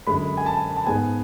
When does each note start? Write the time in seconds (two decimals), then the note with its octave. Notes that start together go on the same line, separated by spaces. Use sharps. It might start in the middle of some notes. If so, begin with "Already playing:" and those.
0.07 F#2 D3 G#3 B5
0.37 G#5
0.46 A5
0.76 A5
0.86 G#2 G#3 B3 G#5